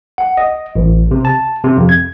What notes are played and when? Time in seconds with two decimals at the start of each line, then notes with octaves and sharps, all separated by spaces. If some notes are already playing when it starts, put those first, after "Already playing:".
0.18 F#5
0.37 D#5
0.76 A1
1.11 C3
1.25 A5
1.64 C3
1.78 F2
1.89 G#6